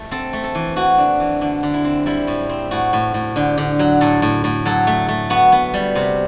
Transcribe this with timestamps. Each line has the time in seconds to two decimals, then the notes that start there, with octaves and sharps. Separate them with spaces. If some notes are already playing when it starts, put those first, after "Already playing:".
Already playing: A3
0.11 C4 A4
0.33 A3
0.44 A4
0.55 E3
0.76 E3 F#4
0.98 D4
1.20 E3
1.41 D3 D4
1.63 D3
1.74 E4
1.85 C4
2.06 G3 E4
2.27 A2
2.49 C4
2.71 A2 F#4
2.93 A2
3.14 A2
3.36 D3 G4
3.58 D3
3.79 F#3
4.01 A2 A4
4.22 A2
4.44 A2
4.65 F#3 A4
4.87 A3
5.09 A3
5.30 B3 F#4
5.52 B3
5.74 G3
5.95 C3